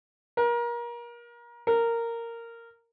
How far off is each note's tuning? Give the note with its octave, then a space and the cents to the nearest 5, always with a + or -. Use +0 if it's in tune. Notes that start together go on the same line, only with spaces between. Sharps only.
A#4 +30
A#4 -10